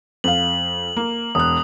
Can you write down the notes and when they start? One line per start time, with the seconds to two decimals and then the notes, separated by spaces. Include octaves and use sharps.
0.24 F2 F5 F#7
0.97 A#3
1.35 E1 D#6 F#6